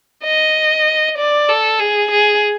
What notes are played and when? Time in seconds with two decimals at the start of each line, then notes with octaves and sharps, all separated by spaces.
0.24 D#5
1.18 D5
1.49 A4
1.80 G#4
2.11 G#4